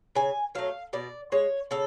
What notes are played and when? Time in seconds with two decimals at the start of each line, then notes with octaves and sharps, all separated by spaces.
0.15 C#3 G#5
0.55 F#3 A3 F5
0.93 B2 D5
1.32 G#3 C#5
1.71 C#3 A4